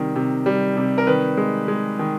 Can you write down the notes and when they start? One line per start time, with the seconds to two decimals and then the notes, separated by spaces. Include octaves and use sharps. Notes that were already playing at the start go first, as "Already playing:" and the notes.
Already playing: C3 D#3 G3
0.16 C3
0.46 G3
0.77 C3
0.98 A#4
1.07 D#3 B4
1.37 G#3
1.68 G#3
1.99 D#3